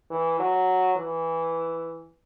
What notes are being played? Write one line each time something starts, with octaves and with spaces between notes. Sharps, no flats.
E3
F#3
E3